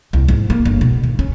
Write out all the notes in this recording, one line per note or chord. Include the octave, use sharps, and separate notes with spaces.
C2
G#2
A#3
G1
B2
D#3
C#4